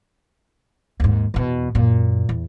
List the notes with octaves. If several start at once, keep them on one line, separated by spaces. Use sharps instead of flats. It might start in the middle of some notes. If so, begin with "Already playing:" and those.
D#2 G#2
E2 B2
F#2 A#2
E2